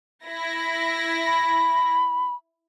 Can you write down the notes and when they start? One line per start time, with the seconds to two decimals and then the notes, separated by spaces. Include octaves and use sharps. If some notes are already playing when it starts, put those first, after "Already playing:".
0.25 E4 A#6
1.26 B5